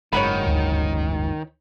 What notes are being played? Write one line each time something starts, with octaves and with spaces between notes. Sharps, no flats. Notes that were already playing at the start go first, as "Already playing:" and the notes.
F#1 G#2 D#3 C#5 F#5 B5
D2